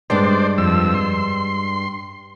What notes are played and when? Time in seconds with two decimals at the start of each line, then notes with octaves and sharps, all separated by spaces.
0.10 G2 G#3 D4 C5 D5
0.58 F2 E6
0.95 C6